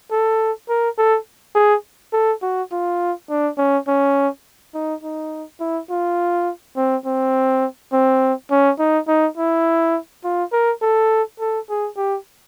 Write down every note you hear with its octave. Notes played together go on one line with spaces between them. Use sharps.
A4
A#4
A4
G#4
A4
F#4
F4
D4
C#4
C#4
D#4
D#4
E4
F4
C4
C4
C4
C#4
D#4
D#4
E4
F4
A#4
A4
A4
G#4
G4